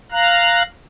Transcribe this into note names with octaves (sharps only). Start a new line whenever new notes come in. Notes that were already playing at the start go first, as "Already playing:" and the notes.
F5 A#5 F#6